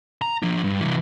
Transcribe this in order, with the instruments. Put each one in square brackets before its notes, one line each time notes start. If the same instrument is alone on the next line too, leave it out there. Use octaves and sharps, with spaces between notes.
[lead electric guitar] A#5
F3 D4
G2
C2 E3